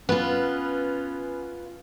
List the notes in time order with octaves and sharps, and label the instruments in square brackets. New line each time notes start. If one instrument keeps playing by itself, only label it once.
[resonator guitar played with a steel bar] B3 [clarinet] C#4 [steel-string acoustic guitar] F4 B4